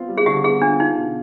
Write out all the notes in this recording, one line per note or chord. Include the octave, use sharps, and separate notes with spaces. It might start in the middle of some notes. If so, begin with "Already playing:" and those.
Already playing: B3 C4 F4
G3
G#4
D3 G4
B3 G#4
D4 F4
D#4 F4
B2